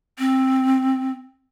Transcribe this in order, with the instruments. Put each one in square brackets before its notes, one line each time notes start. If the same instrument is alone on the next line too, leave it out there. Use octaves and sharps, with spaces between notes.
[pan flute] C4